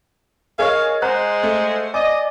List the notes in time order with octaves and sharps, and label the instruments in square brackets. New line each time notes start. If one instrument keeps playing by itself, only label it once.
[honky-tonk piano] G#4 C#5 F6 [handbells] A#4 D#5 C#6 [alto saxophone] F5
[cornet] G#3 [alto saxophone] C5 [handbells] F#5 A#5 [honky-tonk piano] F#6
[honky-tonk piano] A3
[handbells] D5 G#5 [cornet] D#5 [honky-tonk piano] D6